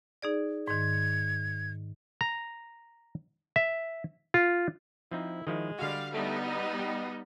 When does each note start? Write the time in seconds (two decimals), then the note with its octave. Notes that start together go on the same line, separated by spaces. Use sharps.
0.22 D#4 G#4 D5
0.68 G#2 D#3 G#6
2.21 A#5
3.56 E5
4.34 F4
5.11 F3 C4 D#4 E4
5.47 D#3 F3 G#3 E4
5.79 D3 G3 F#4 F5
6.14 G3 A3 B3 D#4
6.48 D#5
6.79 G4